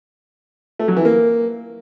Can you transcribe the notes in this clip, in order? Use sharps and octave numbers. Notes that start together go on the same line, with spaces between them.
A3
F#3
E3
A#3